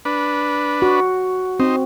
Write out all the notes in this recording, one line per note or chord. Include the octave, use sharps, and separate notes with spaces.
D4 B4
F#4
C4 D#4 C5